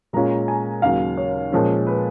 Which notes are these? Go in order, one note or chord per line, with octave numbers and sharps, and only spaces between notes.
A#2 G#3 C#4 F4 A#5
G#5
D#2 C#3 F#3 F5
C#5
A#2 F3 G#3 C#4
B4